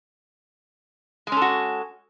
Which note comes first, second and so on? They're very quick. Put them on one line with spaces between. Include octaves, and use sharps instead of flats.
G#3 C#4 A4 F#4